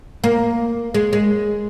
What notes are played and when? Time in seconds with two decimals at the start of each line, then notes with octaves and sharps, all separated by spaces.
0.24 A#3
0.94 G#3
1.13 G#3